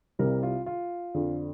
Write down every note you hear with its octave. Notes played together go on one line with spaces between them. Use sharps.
C2 C3 G3 A#4
F4
F4
F2 D3 F3